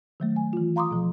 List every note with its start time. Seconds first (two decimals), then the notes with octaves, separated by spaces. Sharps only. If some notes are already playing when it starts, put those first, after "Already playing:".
0.20 D#3 F#3 A3
0.36 G#5
0.53 E3 F4
0.76 F5 A#5 C6 D6 D#6
0.91 B2 F3